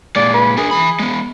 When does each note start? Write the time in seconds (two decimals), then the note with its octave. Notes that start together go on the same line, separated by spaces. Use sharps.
0.16 A#2 G#3 D5
0.34 B4
0.58 D4 G#4 A#4
0.71 E3 B5
0.99 G#3 B3